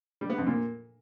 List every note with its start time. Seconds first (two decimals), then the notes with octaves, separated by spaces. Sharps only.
0.21 G3
0.30 B3
0.38 F2
0.47 A#2